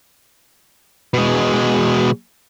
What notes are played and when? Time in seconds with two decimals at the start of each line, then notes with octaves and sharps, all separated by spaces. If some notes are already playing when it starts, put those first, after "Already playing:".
1.14 B2 G#3